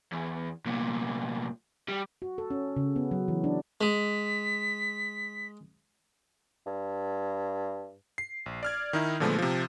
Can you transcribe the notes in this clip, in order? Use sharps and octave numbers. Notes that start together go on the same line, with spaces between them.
E2
C2 A#2
G3
F#4
A4
C#4
C#3
B3
F#3
E3
D4
G#3 B6
G2
C7
A#1
D5 F6 G#6
D#3 D#4 E4
A#2 D3 F3 G#3 A3 B3
C3 F3